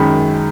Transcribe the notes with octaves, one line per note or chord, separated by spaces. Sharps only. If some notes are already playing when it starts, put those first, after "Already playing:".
Already playing: F#2 D#3 G#3 B5